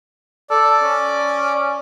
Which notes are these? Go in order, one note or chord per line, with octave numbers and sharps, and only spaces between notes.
A4 D5
C#4